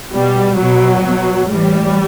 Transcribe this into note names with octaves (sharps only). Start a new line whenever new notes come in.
B2 G3
B2 F#3
B2
A2 E3 G3